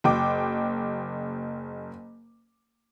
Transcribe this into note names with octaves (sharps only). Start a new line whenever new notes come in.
F#1 G5 D6